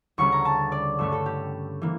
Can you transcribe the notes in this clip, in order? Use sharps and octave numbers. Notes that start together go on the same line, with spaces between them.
D2 C#3 G3 C#6
A#5
A5
D5
G2 D3 A3 C#4 A4
A4
G4
E3 A#3